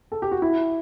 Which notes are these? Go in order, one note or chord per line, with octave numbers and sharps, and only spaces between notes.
A4
G4
F#4
E4